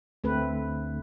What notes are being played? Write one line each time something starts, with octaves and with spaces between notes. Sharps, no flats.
D2 A3 C4 B4